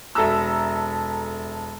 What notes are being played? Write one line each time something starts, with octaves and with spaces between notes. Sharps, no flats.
E1 A4 E5 A#5 E6